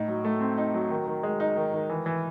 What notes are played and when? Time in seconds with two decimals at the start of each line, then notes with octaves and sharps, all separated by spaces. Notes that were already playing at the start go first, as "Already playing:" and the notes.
Already playing: A2 D#4
0.08 F#3
0.25 A3
0.41 C4
0.58 D#4
0.74 F#3
0.90 D#3
1.07 D#3
1.23 G#3
1.40 D#4
1.56 D#3
1.74 D#3
1.89 E3
2.06 E3